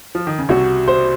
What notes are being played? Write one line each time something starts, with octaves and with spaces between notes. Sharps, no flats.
F3
D#3
C#3
C2 C3 F#4
C5